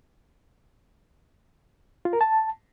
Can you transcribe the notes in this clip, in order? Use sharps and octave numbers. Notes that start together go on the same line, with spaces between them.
F4
A#4
A5